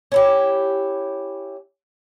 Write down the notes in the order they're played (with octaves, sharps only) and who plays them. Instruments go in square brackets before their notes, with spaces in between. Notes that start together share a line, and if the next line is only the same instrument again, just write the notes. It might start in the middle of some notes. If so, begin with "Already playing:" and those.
[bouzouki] C#4 E4 G4